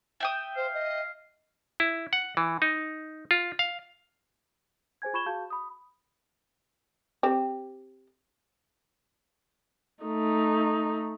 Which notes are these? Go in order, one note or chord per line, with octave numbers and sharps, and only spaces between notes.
E5 G5 D#6
C5 F5
D#5
E4
F#5
E3
D#4
F4
F5
G#4 C5 G#5 G#6
F4 B5 C#6 G#6 E7 G7
F#4 G#4 F5 A5 G6
B5 D#6
C4 G4
A3 D#4